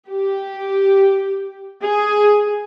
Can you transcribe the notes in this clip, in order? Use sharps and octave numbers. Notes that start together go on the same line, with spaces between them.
G4
G#4